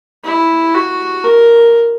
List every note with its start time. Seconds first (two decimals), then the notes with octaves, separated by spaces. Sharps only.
0.24 E4
0.74 F#4
1.24 A#4